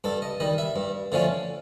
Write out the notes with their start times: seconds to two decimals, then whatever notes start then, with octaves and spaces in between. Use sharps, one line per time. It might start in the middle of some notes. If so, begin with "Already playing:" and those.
0.04 G2 A4
0.22 D#5
0.40 D#3 G3 D#5
0.58 E5
0.76 G2
1.12 D3 F3 A3 C#4